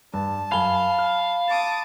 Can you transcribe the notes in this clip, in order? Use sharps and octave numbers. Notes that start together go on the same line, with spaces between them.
G2 A5
F#2 F5 G#5 B5 G7
F6
A5 D6 D#6